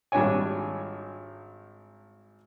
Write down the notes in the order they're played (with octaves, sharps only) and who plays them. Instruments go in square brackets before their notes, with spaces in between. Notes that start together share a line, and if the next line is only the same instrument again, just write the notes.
[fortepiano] G#1 G3 D4 F4 C#5 G#5